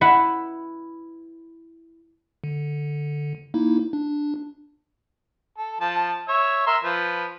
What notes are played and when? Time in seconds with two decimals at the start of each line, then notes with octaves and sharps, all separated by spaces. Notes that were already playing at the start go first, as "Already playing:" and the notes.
0.01 E4 B4 E5 F#5
2.44 D3
3.54 A#3 D#4 E4
3.93 D4
5.58 A4
5.81 F3 A5
6.29 C#5 E5
6.67 A#4 E5 C6
6.84 F3 B4